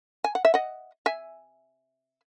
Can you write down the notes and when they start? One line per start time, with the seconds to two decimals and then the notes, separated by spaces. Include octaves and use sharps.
0.24 G#5
0.35 F#5
0.45 E5
0.54 D#5 F#5
1.06 E5 G#5